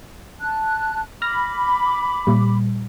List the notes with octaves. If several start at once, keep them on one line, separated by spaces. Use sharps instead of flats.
A5 F#6
B5 D6 F6 A#6
A#2 G3